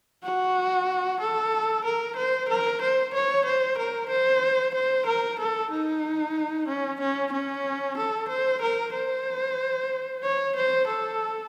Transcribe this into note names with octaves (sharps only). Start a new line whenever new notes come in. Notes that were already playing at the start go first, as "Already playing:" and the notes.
F#4
A4
A#4
C5
A#4
C5
C#5
C5
A#4
C5
C5
A#4
A4
D#4
C#4
C#4
C#4
A4
C5
A#4
C5
C#5
C5
A4